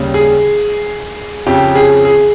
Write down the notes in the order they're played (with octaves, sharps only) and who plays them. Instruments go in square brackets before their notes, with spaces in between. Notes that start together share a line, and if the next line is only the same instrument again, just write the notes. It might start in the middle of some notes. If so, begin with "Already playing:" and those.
Already playing: [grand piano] D#2 C#3 G3
G#4
F2 C#3 F3 G4
G#4
G#4